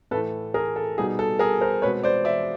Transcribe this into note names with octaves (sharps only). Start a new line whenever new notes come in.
A2 E3 A3 A4 B4
G#4 A#4
A4
B2 G3 B3 D#4 G#4
A4
G#4 A#4
A#4 C5
B2 G#3 C4 B4 C#5
C5 D5
D5 E5